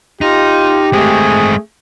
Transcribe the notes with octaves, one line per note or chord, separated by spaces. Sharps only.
D#4 F4 G4
G#3 A3 C4 G#4